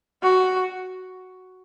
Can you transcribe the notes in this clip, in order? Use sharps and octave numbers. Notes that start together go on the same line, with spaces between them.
F#4